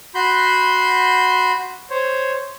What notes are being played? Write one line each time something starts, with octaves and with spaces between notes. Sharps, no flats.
F#4 B5 C6 G6
C5 C#5